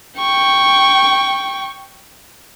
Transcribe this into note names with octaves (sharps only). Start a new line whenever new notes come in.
G5 C#6